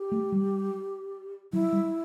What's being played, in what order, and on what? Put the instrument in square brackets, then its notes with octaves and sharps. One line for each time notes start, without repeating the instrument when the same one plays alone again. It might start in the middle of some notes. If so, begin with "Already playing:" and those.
Already playing: [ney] G4
[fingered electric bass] A3
G3
[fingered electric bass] F#3 [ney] E4
[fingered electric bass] G3